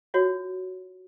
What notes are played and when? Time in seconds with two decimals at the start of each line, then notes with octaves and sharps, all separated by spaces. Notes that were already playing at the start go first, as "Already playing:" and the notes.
0.14 F4 F#4 C#5